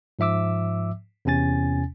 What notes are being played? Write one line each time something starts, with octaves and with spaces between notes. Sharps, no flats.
G#2 F3 E5 D6 E6
E2 C3 C#4 G#5 A6